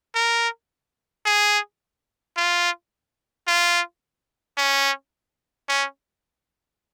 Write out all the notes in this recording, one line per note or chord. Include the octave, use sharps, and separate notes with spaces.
A#4
G#4
F4
F4
C#4
C#4